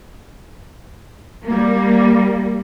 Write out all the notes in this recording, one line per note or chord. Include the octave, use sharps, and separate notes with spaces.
G3 A#3